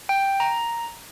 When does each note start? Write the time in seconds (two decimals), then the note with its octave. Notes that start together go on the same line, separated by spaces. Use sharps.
0.09 G5
0.40 A#5